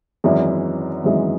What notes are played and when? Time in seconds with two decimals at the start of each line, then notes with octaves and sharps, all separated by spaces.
0.24 G#1 F#2 E3 G#3
1.04 G#1 F#2 E3 G#3